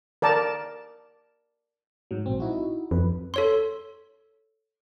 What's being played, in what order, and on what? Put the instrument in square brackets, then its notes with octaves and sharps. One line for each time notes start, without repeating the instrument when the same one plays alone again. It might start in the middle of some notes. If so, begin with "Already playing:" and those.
[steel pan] A#4 D5 A5
[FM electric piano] G#2 F#3
A#1 C4
D#4 E4 F#4
[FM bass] F2 [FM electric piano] B4
[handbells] A4 C#5 C6